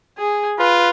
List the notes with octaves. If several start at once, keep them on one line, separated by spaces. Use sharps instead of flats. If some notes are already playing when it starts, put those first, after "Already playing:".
G#4
F4 B4